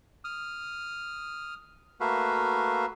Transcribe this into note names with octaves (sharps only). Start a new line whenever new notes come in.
D#6 F6
A3 A#3 F#4 B4 E5 F5